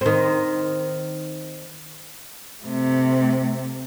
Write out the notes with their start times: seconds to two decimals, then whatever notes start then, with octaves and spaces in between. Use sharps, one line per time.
0.01 D#3 C4
2.63 C3 A3